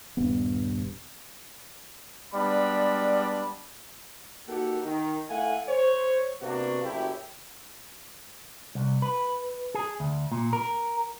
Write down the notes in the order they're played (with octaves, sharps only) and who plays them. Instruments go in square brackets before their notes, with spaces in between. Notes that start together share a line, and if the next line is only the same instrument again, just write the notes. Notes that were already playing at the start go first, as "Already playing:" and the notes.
[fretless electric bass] D#1 G2 B3
[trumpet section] G3 G#3 B3 D4 D5 B5
[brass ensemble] A#3 D#4 F#4 G4 A4 F#5
D#3
A3 E4 F5 F#5 G#5
C5 C#5
C3 A#3 B3 D4 F#4
F#1 F#2 A2 E4 G4 G5
[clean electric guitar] C2
B4
G#4
D2
A#2
A#4